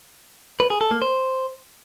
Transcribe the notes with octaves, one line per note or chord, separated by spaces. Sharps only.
B4
G#4
A4
A#3
C5